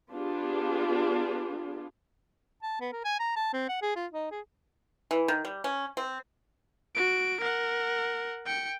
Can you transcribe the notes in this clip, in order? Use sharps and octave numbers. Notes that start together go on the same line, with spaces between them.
B3 D4 F4 G4 G#4
A5
B3
A#4
G#5
A#5
A5
C4
F#5
G#4
F4
D#4
G#4
E3
D#3
G3
C#4
C4
F#4 D7
A#4 F#5
G5 C#7